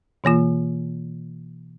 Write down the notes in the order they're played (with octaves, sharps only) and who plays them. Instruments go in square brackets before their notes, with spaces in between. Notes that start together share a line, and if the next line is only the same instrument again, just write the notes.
[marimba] B2 E3 A#3 F4